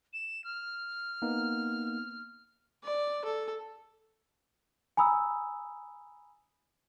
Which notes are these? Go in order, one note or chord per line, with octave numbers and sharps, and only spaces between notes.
E7
F6
A#3 B3 D#4
D5
A4
G#5 A#5 B5 D#6 E6